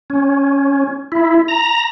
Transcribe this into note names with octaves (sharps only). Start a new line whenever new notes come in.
C#4
E4
A#5